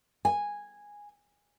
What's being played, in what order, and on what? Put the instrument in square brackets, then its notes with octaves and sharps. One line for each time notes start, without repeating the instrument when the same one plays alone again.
[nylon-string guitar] G#5